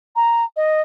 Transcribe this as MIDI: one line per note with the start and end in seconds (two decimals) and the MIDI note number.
0.16 0.44 82
0.56 0.81 75